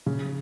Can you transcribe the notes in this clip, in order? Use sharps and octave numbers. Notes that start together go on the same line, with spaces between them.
C#3